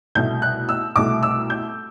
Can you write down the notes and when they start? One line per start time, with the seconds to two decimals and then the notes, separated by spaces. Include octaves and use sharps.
0.15 C2 B2 A3 G6
0.42 F#6
0.69 E6
0.96 C2 B2 A3 D6
1.23 E6
1.50 G6